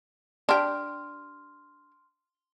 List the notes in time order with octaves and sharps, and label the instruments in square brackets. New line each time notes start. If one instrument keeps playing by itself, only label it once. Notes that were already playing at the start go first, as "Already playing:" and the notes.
[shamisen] D4 G4 [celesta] C6 F6